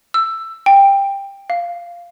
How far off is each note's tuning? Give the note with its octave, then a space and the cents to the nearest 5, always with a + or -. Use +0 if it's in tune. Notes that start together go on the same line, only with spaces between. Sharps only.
E6 +10
G5 +15
F5 -10